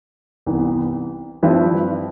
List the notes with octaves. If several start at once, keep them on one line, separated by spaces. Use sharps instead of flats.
C2 C3 E3 B3
G2 F3 C4 E4 B4